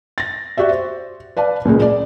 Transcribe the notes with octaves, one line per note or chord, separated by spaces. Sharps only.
A6 A#6
F#4 G4 D5 E5
C5
B4 D5 F5 A5
C#2 A#2 C#3 G#3
D5